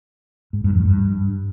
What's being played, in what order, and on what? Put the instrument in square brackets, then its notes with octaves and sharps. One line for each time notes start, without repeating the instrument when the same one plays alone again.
[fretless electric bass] G#2
G2
F2
G2